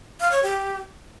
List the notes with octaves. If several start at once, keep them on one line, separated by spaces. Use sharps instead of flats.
F5
C#5
G4